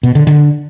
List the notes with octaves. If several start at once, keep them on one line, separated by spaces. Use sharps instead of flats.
B2
D3
D3